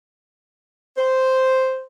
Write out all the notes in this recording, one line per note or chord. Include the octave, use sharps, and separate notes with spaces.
C5